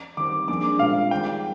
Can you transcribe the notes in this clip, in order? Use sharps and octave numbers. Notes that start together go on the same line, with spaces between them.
D#3 G3 C4 D6
F3 A#3 D4 G#4 D6
A#2 G#3 C4 F4 F5
D#3 G3 C4 G5